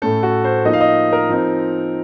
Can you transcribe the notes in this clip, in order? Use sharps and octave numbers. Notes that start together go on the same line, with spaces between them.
A2 A3 C#4 A4
F#4
C5
F3 A#3 D#4 D#5
F5
D#5
A#4
F3 C4 D#4